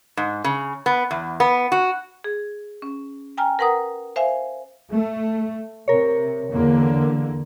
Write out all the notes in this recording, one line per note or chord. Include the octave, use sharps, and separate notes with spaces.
G#2
C#3
B3
E2
B3
F#4
G#4
C#4
G5 G#5 A#5 F6
A#4 B4 F#5 A#5 D#6
C5 E5 F5 G#5
A3
C3 A#4 C#5
E2 D3 A#3